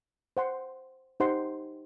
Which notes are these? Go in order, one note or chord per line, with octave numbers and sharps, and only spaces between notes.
C5 F#5 C6
D#4 G4 C5 F#5 C6